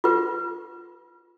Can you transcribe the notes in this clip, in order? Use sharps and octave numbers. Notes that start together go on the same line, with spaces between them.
F4 B4